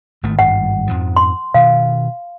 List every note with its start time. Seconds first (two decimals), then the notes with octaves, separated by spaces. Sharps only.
0.23 G#1 D#3 A3
0.39 G#1 G2 G3 F#5
0.87 F2 G#2 F3
1.17 C6
1.54 B2 D#3 F5